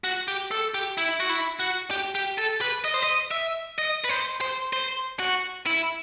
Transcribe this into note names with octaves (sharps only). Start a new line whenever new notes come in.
F#4
G4
A4
G4
E4
F#4
E4
F#4
G4
G4
A4
B4
D#5
C5
D#5
E5
D#5
B4
C5
C5
C5
F#4
E4